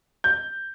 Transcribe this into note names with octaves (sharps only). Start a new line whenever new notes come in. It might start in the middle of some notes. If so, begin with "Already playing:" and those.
G6